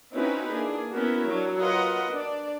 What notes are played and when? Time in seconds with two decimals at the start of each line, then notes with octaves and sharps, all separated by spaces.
0.14 C4 C#4 D#4 E4 F#4 B4
0.52 A#3 D4 G#4
0.92 B3 C#4 E4 F#4 A#4
1.28 F#3 D4
1.62 F4 A#4 B4 D#5 F#5
2.12 D4 D5